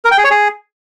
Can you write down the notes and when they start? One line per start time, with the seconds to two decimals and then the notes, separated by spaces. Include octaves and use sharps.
0.05 A#4
0.11 G5
0.18 G#4
0.24 C#5
0.31 G#4